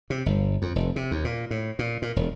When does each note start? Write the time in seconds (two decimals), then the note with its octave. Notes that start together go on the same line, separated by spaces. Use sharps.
0.10 C3
0.26 G1
0.62 F2
0.76 F1
0.96 C3
1.11 D#2
1.25 A#2
1.51 A2
1.79 A#2
2.02 A#2
2.16 E1